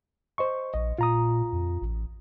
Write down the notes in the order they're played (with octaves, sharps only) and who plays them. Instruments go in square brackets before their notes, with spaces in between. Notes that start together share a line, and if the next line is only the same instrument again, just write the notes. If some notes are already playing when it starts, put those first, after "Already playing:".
[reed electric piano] C5 D#5 C#6
[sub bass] A#1 [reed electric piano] D#5
[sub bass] A#2 [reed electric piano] F4 A#5 D#6
[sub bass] F2
A1